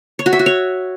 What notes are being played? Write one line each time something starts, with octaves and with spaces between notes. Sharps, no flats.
C#5
F#4
E5
F#4
C#5